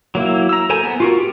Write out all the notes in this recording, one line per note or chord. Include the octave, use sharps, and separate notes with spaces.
F#3 A#3 E4
A#5 E6
A4 A#4 C5 G#5 A#5
B3
F4 F#4 A#4
G4